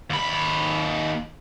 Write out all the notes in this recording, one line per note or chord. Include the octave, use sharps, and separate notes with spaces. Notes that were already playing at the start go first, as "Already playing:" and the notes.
D#2 B5